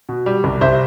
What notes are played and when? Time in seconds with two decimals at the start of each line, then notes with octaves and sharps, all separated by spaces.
0.09 B2
0.26 G3
0.44 C2
0.61 C2 C5 E5